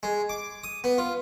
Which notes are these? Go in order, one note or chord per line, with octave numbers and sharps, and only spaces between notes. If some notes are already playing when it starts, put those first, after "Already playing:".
G#3
D6
D#6
B3
F4